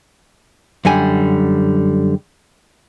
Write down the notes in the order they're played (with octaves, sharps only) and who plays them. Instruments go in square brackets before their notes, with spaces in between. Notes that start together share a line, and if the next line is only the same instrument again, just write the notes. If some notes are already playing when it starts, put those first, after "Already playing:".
[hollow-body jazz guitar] F#2 D3 G3 G#5